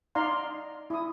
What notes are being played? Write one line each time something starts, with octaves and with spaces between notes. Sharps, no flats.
D#4 D5 F5 A#5 C6
E4 D#6